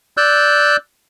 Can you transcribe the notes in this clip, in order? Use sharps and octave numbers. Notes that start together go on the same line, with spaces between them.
D5 E6 F#6 G6